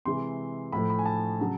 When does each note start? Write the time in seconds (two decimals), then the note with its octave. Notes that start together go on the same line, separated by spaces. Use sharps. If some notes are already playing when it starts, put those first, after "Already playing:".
0.05 C3 E3 G#3 C6
0.72 A2 F3 A3 B5
0.90 B5
0.99 G#5
1.06 A5
1.40 C#3 F#3